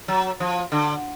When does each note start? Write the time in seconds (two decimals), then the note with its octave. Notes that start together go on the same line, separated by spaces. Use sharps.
0.08 F#3
0.40 F3
0.72 D3